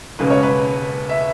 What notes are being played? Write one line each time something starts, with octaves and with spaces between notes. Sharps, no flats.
E1 D#2 C#3 G#3 C#4 B4
C#5
B4
E5